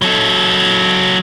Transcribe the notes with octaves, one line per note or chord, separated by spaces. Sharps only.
F#3 A4